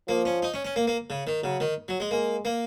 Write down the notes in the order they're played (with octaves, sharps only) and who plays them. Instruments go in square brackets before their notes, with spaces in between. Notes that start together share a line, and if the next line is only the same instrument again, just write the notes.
[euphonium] F3 [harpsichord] A#3
[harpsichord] C#4
D#4
C#4
C#4
A#3
A#3
C#3
D#3
[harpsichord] C#3 [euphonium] F#3
[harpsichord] D#3
F#3
G#3
[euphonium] G#3 [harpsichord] A#3
[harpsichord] A#3